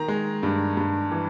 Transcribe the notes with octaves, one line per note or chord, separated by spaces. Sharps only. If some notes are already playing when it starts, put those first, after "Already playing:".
Already playing: D#3 A#5
G#3
G2
G2
E3